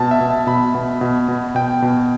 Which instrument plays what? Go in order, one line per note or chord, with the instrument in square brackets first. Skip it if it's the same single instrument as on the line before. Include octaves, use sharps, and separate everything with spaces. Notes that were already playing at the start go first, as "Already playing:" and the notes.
Already playing: [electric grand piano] B2 A5
E5
B2
B2 B5
B2
B2
B2
B2 G5
B2